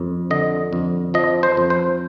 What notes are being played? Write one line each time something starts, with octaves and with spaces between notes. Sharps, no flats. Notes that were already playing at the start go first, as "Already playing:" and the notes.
Already playing: F2
D3 D#5
F2
F3 D#5
C5
F2
C5